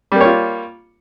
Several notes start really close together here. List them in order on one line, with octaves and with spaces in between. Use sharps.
G3 A#3 C#5 F4